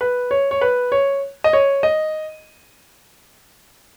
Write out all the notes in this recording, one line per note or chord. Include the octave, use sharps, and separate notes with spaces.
B4
C#5
C#5
B4
C#5
D#5
C#5
D#5